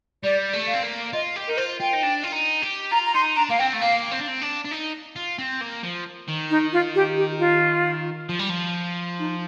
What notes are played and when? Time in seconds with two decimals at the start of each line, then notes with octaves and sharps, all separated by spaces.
0.23 G3 D5
0.53 A3
0.68 F5
0.74 C4
0.83 A#3
1.13 F4 D#5
1.36 G4
1.48 D#4 A#4
1.57 F4 C5
1.80 F4 G5
1.93 D#4
2.03 D4
2.24 F4
2.33 D#4
2.62 G4
2.92 F4 A#5
3.06 A#5
3.14 D#4 C6
3.36 D4 A#5
3.49 A#3 F5
3.59 C4 G5
3.73 A3
3.81 A#3 F5
4.11 C4
4.19 D4
4.27 C4
4.42 D4
4.65 D4
4.71 D#4
5.16 F4
5.38 C4
5.61 A#3
5.83 F3
6.28 D#3
6.50 D#4
6.73 F4
6.95 G4
7.17 G4
7.39 F4
8.29 F3
8.39 G3
8.50 F3
9.19 D#4